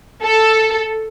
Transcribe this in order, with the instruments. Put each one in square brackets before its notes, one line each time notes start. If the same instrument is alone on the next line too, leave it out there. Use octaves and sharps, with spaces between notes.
[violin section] A4